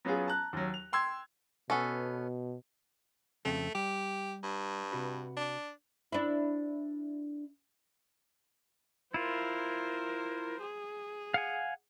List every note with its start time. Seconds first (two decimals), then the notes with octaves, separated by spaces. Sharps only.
0.05 F#3 B3 C#4 F4 G#4
0.28 A5 A#5 F#6
0.53 D#2 F#3
0.74 F7
0.93 G5 C6 E6 G#6
1.70 B2 B3 C#4 A4
3.45 F2 C#3 A3 C4
3.75 G3 G4
4.44 G2
4.92 C3 F#4 B4
5.37 D4
6.12 D4 E4
9.14 E4 F4 A#4 C5
10.61 G#4
11.34 F5 F#5 G#5